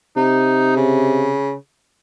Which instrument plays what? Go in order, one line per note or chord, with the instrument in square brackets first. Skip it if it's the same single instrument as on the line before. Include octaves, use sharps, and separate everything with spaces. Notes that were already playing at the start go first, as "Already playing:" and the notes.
[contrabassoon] C3 [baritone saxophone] D#4
[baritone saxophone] C#3